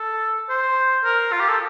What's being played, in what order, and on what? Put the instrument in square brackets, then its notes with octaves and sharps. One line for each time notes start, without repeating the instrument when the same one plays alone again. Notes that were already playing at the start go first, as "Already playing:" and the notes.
Already playing: [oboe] A4
C5
A#4
F4
G4
A4